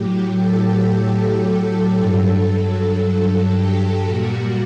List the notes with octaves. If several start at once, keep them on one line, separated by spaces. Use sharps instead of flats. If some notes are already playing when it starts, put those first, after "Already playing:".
Already playing: A2 F#3 G4
A4
G2 F#3 A4
G4
A#2 G3 F#4